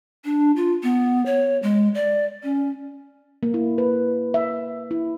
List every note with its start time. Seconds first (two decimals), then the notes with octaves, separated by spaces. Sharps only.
0.25 D4
0.56 F4
0.83 B3
1.26 C#5
1.63 G#3
1.95 D5
2.43 C#4
3.43 A#3
3.54 E4
3.78 B4
4.34 E5
4.91 E4